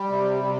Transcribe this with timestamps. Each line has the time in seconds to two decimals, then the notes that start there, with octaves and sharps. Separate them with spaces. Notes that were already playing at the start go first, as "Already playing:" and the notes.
Already playing: G3
0.09 C3
0.44 C3